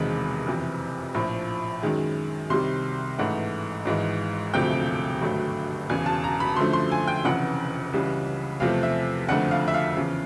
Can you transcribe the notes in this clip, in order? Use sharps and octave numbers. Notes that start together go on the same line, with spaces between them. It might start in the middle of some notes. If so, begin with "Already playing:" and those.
Already playing: E1 E2 C3 D#3 G#3 B5
F#1 F2 C3 E3
A#1 A2 F3
F#2 D#3 G#3
C2 C3 D#3 G3 C6
A1 G#2 E3 A3 F#5
G#1 G#2 E3 G#3
E1 D2 C3 F3 A3 G5
G#1 G2 D3 F#3 A3
E1 E2 C#3 G#5
A5
A#5
B5
F#2 D3 F3 A3 C6
C6
G#5
G5
F1 F2 C#3 E3 F#5
C#2 C#3 E3 G3
E2 C3 F3 A3 F5
E5
F#1 F2 D3 F3 A3 F#5
F5
E5
F5
E2 C#3 F3